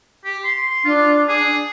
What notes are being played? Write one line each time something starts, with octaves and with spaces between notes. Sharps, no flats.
G4
C6
D4 F4
G#4